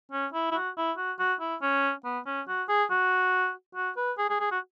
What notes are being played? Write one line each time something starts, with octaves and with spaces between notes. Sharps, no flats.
C#4
E4
E4
F#4
E4
F#4
F#4
E4
C#4
B3
C#4
F#4
G#4
F#4
F#4
B4
G#4
G#4
G#4
F#4